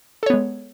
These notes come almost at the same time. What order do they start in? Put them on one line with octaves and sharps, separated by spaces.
A4 C#5 B3 G#3